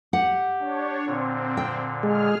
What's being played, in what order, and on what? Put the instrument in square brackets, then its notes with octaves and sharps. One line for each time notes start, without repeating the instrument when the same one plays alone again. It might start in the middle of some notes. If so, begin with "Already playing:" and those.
[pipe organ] G4 [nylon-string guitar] F#5
[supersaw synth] D4 C#5
[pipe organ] A#2 D3 [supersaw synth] C4
[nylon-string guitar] G5
[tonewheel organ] G#3 [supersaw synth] G#4 F6